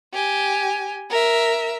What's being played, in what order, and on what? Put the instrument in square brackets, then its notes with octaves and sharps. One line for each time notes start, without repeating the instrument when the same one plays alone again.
[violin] G4 G#5
A#4 E5